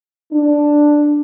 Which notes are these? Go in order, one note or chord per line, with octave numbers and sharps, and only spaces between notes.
D4